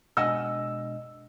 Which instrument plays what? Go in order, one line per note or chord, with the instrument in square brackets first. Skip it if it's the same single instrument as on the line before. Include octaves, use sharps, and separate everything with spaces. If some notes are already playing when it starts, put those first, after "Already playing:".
[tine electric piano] B2 G#3 D4 [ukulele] D#5 F#5 G#5 [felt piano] E6